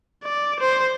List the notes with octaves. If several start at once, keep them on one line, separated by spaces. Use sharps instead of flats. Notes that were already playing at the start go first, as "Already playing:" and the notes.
D5
C5